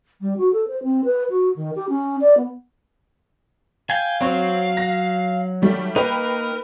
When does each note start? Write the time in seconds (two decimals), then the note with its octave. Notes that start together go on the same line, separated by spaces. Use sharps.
0.21 G3
0.38 F#4
0.53 A4
0.68 C5
0.83 C4
1.05 B4
1.30 F#4
1.56 D#3
1.76 G4
1.89 C#4
2.21 D5
2.37 B3
3.90 F5 G5 G#5
4.21 F#3 C4 C5 C#5
4.77 A#6
5.62 D#3 G3 A3
5.96 A#3 D#4 A#4 B4 G5